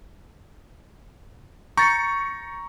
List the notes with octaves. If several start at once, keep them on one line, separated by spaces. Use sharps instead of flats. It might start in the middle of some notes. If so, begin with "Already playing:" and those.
A#5 C#6 G6 A6 C#7